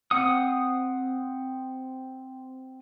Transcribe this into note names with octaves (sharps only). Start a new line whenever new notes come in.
C4 F#5 D#6